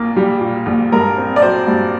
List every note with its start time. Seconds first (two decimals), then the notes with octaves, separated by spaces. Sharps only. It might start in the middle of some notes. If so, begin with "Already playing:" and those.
Already playing: A#1 A#3
0.16 G3
0.41 A#2
0.66 A#1
0.92 G2 A#4
1.17 C4
1.36 D5
1.42 F#3 C5
1.67 G2